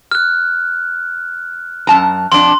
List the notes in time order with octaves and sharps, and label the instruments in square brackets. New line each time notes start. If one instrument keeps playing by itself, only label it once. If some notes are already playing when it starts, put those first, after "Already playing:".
[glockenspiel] F6 F#6
[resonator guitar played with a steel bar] F#2 A5 A#5
[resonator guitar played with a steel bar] F2 D4 [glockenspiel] C6